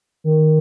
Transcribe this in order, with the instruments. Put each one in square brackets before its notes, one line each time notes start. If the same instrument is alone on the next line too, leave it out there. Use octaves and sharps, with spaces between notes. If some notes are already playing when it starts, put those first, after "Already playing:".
[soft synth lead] D#3